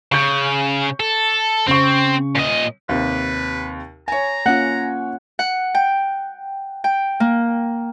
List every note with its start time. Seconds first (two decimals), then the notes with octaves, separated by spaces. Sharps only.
0.12 C#3 C#6 G6
1.00 A4
1.68 C#3 C4 C#6
2.35 A#2 D#5
2.89 D#2 C3 B4
4.08 C#5 G#5 A#5
4.46 A#3 C#4 F4 F#5
5.39 F#5
5.75 G5
6.84 G5
7.20 A#3